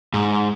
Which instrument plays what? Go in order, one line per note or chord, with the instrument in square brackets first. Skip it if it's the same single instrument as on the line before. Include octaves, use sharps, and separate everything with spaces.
[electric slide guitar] G#2